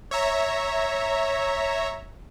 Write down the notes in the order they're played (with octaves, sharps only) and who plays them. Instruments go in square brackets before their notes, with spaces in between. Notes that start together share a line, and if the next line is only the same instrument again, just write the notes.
[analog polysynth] C#5 E5 A#5